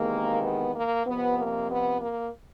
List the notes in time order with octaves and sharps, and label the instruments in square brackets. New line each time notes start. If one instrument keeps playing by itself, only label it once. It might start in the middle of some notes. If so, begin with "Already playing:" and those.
Already playing: [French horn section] E2 C3 D#3 G#3 A#3
B3
A#3
F2 C3 F3 B3
A#3
B3
A#3